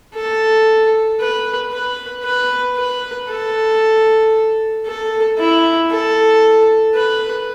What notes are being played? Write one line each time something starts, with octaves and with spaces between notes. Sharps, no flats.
A4
B4
B4
B4
B4
A4
A4
E4
A4
B4